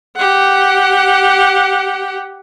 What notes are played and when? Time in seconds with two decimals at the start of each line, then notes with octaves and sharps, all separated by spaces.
0.16 G4 F#5